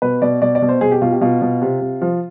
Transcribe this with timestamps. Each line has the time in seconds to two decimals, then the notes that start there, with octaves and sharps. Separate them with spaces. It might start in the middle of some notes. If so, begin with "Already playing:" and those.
0.02 B2 B4
0.22 B2 D5
0.42 B2 D5
0.55 D5
0.62 B2
0.69 C5
0.81 B2 G#4
0.91 G4
1.02 B2 F4
1.12 G4
1.21 B2 F4
1.42 B2
1.62 C3
1.81 C3
2.02 F3